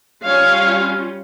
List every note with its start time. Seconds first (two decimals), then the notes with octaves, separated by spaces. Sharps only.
0.24 G3 C#4 F4 C#5 F5